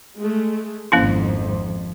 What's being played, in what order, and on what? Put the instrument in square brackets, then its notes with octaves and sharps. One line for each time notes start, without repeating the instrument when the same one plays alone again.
[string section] G#3 A3
[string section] G#1 F2 [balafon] A#3 C#4 E4